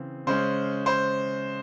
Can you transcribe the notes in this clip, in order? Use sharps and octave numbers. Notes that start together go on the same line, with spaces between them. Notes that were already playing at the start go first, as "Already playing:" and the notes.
Already playing: C#3 E3 C4
C#3 G#3 C#4 C5
C5